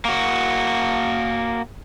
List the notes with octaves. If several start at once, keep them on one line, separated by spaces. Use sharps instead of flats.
A#3 F#4